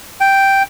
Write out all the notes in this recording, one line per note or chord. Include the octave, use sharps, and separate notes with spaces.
G5